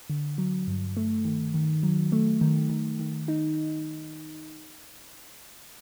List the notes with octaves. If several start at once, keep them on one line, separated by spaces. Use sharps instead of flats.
D3
F#3
G2
A3
D#3
D#3
F#3
A3
D#3
D#3
D#3
D#4